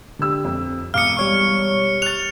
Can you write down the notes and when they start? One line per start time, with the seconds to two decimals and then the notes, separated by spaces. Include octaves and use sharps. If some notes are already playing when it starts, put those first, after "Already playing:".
0.19 D3 G4 E6
0.45 F2
0.94 E1 F5 D6 D#6 F6 C#7
1.17 G3 C#5 C#6
2.02 F#6 A6 F7